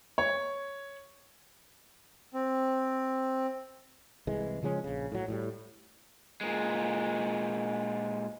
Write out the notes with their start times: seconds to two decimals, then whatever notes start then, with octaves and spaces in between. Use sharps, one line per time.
0.18 C#5
2.34 C4
4.27 C2 E3 G#3
4.63 C#3 F3 G#3 C#4
4.84 A#1 C#3
5.12 A2 F#3
5.28 A2 F#3 G3
6.41 A#2 G#3